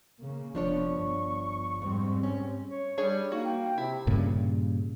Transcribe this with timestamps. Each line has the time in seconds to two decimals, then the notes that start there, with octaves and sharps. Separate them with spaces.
0.18 C#3 A#3
0.55 F1 F3 B3 D4 C#5 C#6
0.95 G1
1.82 F2 G#2 G3 C4
2.23 C#4
2.71 C#5
2.98 G3 D4 G#4 C#5
3.32 A#3 D#4 F#4
3.44 G5
3.78 C3 E4
4.07 G2 A#2 C#3